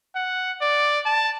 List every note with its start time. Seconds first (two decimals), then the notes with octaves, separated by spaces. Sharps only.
0.15 F#5
0.61 D5
1.05 A5